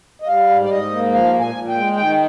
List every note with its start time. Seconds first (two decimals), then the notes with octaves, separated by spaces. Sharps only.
0.22 D#5
0.28 G3 F5
0.49 G#2
0.64 D5
0.70 G#2 D#5
0.91 A#3
1.12 F3 F5
1.33 A#2
1.40 G#5
1.55 A#2
1.69 G5
1.75 G#3
1.96 D#3 G5